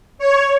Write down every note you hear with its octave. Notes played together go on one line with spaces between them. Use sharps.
C#5